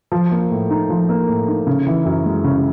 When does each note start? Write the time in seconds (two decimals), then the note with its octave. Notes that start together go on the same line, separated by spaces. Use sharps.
0.12 F3
0.31 A#3
0.51 A2
0.70 D#4
0.89 F3
1.09 A#3
1.28 A2
1.48 D#4
1.67 C#3
1.87 E3
2.05 F#2
2.26 G#3
2.44 C#3